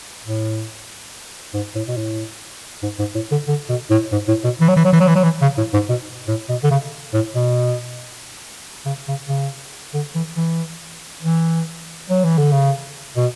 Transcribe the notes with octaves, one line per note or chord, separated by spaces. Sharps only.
A2
G#2
A2
B2
A2
G#2
G#2
A2
D3
D3
B2
A2
G#2
A2
B2
E3
F#3
E3
F#3
E3
F#3
E3
F#3
E3
C#3
A2
G#2
B2
A2
B2
D3
C#3
A2
B2
C#3
C#3
C#3
D3
E3
E3
E3
F#3
E3
D3
C#3
B2